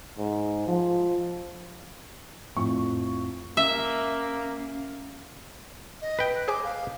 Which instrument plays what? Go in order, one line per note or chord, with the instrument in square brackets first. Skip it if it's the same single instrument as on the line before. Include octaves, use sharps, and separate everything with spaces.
[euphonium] G#2
F3
[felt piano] F2 A2 F3 C#6
[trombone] A#3 [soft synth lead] C#4 [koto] E5
[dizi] D#5
[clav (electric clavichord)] B4 G5
[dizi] F#6
[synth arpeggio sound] G#4 C5 G#5 [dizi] D6
[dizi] F5